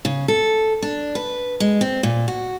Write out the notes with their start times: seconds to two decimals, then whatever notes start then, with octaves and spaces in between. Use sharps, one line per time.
0.05 C#3
0.28 A4
0.82 D4
1.15 B4
1.60 G#3
1.81 C4
2.03 A#2
2.28 F#4